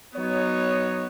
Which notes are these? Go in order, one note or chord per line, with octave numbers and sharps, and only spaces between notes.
F#3 B3 D#4 C#5